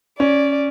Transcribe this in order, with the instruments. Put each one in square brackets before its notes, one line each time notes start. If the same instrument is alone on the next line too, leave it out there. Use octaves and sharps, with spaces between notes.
[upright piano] C#4 [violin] D5